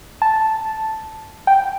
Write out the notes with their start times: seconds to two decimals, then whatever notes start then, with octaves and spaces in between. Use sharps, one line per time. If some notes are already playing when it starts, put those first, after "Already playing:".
0.22 A5
1.47 G5